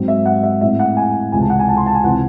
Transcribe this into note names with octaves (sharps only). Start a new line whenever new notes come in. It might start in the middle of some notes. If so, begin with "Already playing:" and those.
Already playing: G#2 F#3 C4
E5
F#5
E5
A2 G#3 C4 E5
F#5
G#5
C#2 C3 E3 G#3 G#5
A5
F#5
G#5
A5
C6
A5
G#5
C#2 C3 E3 C4 F#5